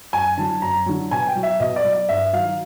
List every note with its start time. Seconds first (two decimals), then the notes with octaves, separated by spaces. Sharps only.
0.13 F#2 G#5
0.37 D3 F#3 A5
0.62 F#2 A#5
0.86 D3 F#3
1.11 B2 G#5
1.27 G5
1.35 F#3
1.43 E5
1.60 B2 D#5
1.76 D5
1.84 F#3
1.93 D5
2.09 G2 E5
2.33 D#3 F#3 F5